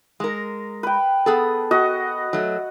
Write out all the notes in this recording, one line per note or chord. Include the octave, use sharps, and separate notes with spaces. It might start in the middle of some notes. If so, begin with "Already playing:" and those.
G#3 A#4
B4 G5
B3 G#4 A4
F#4 D#5 F#5
F#3 A3